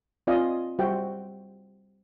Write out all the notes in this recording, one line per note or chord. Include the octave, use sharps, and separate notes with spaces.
C4 F4 D5 D#5 F5 G#5
G3 F#4 C5 E5 G5